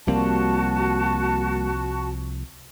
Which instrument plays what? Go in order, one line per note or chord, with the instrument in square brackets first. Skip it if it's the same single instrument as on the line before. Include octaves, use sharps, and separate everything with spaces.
[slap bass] C2 F3 C4 [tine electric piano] G3 A#3 [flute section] F#4 A5